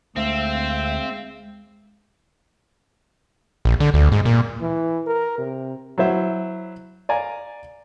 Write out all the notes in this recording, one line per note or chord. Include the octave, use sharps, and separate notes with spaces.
D2 G#3 A3 C4 E5 F5
A#1
D3
D2
G#2
A#2
E3
A#4
C3
F#3 E4 C5 E5
D5 F5 G#5 A#5